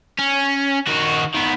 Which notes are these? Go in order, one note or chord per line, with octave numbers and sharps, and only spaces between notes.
C#4
D#3 F#4
D#3 B3